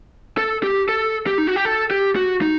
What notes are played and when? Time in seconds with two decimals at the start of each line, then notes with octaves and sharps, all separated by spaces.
0.38 A4
0.63 G4
0.89 A4
1.27 G4
1.38 D#4
1.47 F#4
1.56 G4
1.65 A4
1.91 G4
2.16 F#4
2.42 D#4